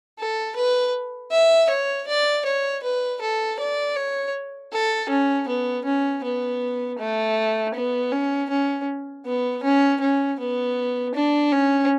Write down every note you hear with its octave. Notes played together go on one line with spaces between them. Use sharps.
A4
B4
E5
C#5
D5
C#5
B4
A4
D5
C#5
A4
C#4
B3
C#4
B3
A3
B3
C#4
C#4
B3
C#4
C#4
B3
D4
C#4